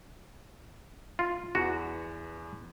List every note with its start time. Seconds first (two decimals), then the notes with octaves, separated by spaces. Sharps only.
1.19 F4
1.55 E2 E3 F#4